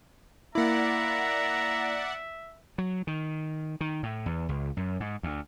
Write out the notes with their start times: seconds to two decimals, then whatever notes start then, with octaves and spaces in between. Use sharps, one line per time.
0.55 A#3 E4 D5 E5 F#5 A#5
2.78 F#3
3.07 D#3
3.81 D#3
4.03 A2
4.26 E2
4.49 C#2
4.77 F#2
5.00 G#2
5.23 D2